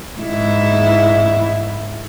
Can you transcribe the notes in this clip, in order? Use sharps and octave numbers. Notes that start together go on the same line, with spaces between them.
G#2 E4